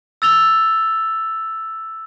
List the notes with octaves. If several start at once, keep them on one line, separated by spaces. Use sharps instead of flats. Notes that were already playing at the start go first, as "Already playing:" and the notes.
E6 A6 F7 G7